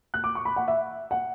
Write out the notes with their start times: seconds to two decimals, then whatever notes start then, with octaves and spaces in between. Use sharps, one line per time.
0.14 F#6
0.24 D6
0.35 C#6
0.45 B5
0.56 F#5
0.68 E5
1.11 F#5